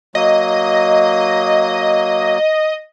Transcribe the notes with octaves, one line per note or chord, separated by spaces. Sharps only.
F#3 A#3 D#5